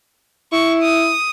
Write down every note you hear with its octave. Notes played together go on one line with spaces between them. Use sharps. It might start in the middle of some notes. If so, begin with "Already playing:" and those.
E4 C#6
D#6